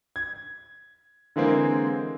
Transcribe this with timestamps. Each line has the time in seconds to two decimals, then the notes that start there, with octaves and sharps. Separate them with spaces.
0.16 G#6
1.36 D3 E3 G#3 A#3 C4